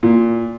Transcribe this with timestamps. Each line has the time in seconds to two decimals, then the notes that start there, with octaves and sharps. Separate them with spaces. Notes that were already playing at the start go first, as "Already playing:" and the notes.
0.03 A#2